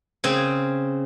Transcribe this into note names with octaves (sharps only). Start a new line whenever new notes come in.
C#3 C4